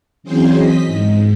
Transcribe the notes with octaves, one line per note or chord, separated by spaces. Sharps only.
E3 F#3 C4 C#4 G#4 C5
D#5 B6
G#2